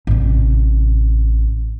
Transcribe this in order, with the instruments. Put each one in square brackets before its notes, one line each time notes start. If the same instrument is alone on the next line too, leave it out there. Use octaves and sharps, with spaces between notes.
[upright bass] A1 C3